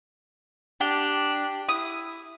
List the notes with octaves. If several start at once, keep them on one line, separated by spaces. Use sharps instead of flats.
D4 G4
E4 D#6